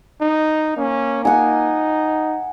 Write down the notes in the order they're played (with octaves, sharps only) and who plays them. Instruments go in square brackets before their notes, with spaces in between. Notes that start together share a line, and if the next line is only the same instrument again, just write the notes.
[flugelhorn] D#4
[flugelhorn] A#3 [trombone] C#4
[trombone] D#4 [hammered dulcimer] F#5 G#5